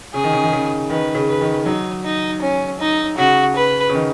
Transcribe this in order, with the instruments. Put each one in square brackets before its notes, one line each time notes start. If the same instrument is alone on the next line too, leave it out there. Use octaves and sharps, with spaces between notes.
[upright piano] C#3 [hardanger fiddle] G#4
[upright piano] D#3
C#3
D#3
C#3
[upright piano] D#3 [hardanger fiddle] B4
[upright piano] C#3
[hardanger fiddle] B4
[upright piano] D#3
[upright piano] F#3 [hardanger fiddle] D#4
[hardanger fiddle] D#4
C#4
D#4
[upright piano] C#3 [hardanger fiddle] F#4
[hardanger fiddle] B4
[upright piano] C#3
D#3